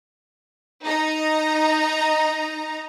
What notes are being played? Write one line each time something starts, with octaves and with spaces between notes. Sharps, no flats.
D#4 A#5